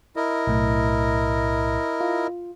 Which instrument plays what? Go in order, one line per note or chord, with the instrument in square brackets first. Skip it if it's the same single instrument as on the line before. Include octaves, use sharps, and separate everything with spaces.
[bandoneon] E4 A#4 D#5
[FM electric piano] B1 A2
F4